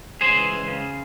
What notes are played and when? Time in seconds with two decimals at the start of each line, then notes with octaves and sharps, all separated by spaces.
0.21 C#2 G#4 C5
0.36 E3
0.52 C#2
0.68 C#3